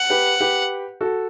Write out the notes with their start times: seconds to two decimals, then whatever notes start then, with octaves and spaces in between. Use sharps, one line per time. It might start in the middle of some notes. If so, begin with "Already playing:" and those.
Already playing: F#5
0.10 G4 B4
0.40 G4 B4
1.01 F#4 A4